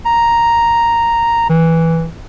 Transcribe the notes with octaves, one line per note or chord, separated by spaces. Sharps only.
A#5
E3